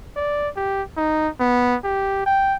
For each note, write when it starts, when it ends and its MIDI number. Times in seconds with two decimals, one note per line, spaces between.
0.16 0.49 74
0.56 0.82 67
0.97 1.28 63
1.40 1.75 59
1.84 2.21 67
2.26 2.56 79